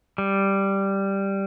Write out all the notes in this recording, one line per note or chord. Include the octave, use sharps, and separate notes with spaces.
G3